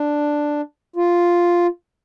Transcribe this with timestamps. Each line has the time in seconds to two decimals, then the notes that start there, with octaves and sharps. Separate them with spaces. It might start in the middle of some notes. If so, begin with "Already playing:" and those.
Already playing: D4
0.96 F4